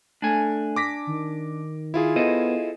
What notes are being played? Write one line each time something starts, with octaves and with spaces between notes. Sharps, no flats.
A3 D4 G#5
D6 A#6 B6
D#3
E4 F4 G#4
B3 A4 C5 D#5